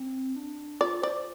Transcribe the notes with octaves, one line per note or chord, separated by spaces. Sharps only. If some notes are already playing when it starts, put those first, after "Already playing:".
Already playing: C4
D4
F4 D5
C5 D5
C5